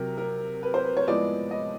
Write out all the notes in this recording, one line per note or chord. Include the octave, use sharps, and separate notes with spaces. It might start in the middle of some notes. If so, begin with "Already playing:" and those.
Already playing: C3 F#3 A#4
A#4
B4
C5
B4
C#5
A2 F3 G#3 B3 D5
D#5